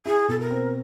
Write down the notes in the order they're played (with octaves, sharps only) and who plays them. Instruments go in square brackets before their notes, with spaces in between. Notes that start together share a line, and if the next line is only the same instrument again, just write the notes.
[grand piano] E4 [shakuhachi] G#4
[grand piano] B2 [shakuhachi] A4
[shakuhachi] A#4
[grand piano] C4